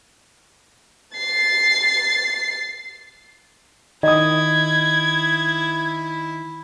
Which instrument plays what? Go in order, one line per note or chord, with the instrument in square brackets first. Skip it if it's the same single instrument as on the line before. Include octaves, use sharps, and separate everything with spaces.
[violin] A6 C7
[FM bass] D#3 [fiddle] E4 [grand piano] D#5 D#6 [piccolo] G#6